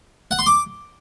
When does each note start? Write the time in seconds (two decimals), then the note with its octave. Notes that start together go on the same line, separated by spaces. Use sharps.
0.31 F#5
0.39 C6
0.46 D6